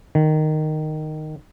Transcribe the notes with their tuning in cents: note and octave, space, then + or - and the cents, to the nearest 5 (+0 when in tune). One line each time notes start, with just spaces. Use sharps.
D#3 -10